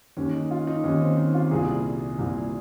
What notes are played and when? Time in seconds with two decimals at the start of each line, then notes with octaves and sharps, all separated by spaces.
0.17 D#2 D#3 C#4
0.33 D#4
0.51 F4
0.67 D#4
0.84 D#2 D#3 C#4
1.01 C4
1.17 D#4
1.34 F4
1.51 C2 A#2 G#4
2.18 C2 A#2